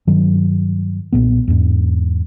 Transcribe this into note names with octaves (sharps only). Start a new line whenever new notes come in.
G2 D#3 F#3
B1 E2 A#2 B3
E2 G#2